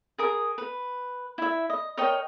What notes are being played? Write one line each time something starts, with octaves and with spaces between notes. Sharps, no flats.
G#4 A#4 D#6
B4
E4 E5
D#5
A#4 C#5 D#5 G5